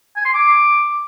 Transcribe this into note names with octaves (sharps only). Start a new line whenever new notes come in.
G#5
C6
D6